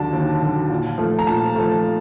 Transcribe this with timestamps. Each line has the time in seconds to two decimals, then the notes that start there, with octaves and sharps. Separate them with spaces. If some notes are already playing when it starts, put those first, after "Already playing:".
Already playing: D#2 D3 F#3 A5
0.13 D#2
0.42 D3 F#3
0.70 A#2
0.98 F3 A3
1.19 A#5
1.27 A#2 A5
1.56 F3 A3